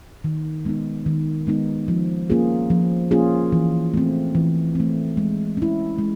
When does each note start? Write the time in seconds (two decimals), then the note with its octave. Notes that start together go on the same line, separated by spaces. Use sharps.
0.24 D#3
0.65 G#3 B3 D#4
1.06 D#3
1.47 G#3 B3 D#4
1.88 F3
2.30 A#3 C#4 F4 G#4
2.70 F3
3.11 A#3 C#4 F4 G#4
3.52 E3
3.94 A3 C4
4.35 E3
4.75 A3 C4
5.17 G#3
5.57 C#4 E4
5.98 G#3